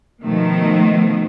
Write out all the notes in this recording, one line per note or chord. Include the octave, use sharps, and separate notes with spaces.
B2 D#3 F3 A3